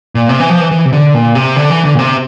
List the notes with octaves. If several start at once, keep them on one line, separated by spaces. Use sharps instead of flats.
A#2
C3
E3
F3
E3
E3
C3
D3
A#2
C3
D3
E3
D3
A#2
C3